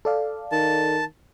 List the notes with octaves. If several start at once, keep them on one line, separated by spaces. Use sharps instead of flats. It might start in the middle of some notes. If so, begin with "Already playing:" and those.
A4 D5 F5
D#3 A5